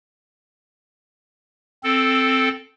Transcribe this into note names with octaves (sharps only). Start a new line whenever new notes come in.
C4 A4